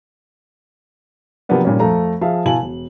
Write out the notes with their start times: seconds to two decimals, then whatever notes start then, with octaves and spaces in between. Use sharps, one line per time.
1.49 C3 F3 F#3 A#3 B3 D4
1.65 G2 A#2 D#3 G3 A#3 C#4
1.80 F2 A3 A4 F5 A#5
2.21 F3 G#4 E5 F5 A5
2.45 B2 E4 F5 G#5 A5 F#7
2.62 E1